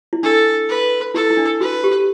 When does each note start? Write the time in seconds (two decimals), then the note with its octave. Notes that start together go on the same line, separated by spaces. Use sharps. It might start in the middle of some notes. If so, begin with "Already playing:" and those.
0.13 E4
0.23 D4 A4
0.69 B4
1.14 E4 A4
1.30 E4
1.37 D4
1.61 F#4 B4
1.84 G4